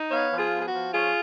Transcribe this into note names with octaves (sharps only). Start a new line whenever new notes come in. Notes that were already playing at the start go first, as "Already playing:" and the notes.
Already playing: D#4
B3 C#5 F5
F3
F4 G#4
B3
G#4
F#4
F3
C#4 F4 G#4